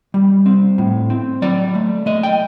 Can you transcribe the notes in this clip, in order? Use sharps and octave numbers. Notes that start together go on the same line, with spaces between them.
G3
C4
A2
C4
F#3 D5
A3
A3 D#5
G5